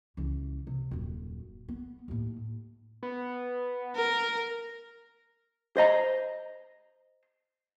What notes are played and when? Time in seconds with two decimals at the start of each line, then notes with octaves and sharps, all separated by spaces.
0.17 C#2 E3
0.67 C3
0.91 D#1 F#2
1.69 B3
2.08 D#2 A2
3.03 B3
3.96 A#4
5.77 C5 D#5 A#5